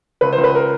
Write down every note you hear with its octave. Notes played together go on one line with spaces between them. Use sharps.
C#2 B4
C5
C#2
B4
A#4